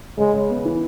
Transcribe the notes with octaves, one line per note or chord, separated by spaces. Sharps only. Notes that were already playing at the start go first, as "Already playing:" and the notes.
C#3 G#3
C#3
B3
E3